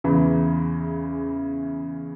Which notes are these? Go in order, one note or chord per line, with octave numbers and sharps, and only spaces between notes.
E2 C#3 E3